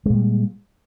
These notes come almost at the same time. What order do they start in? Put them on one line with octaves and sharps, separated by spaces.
G#3 A#2 G3